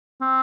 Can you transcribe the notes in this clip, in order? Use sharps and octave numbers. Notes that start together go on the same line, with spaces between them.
C4